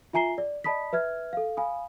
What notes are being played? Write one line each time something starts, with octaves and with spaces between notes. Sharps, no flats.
F4 E5 G#5 A#5 C7 G7
D5
D5 D#5 A5 B5 D#6 B6
B4 E5 F6 G#6
A4 F5
F5 G#5 B5 D#6